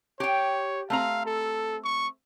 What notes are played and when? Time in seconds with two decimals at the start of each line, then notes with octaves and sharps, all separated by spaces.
0.20 G4 C#5 G5
0.90 A3 C4 F5 A#5
1.26 A4
1.84 C#6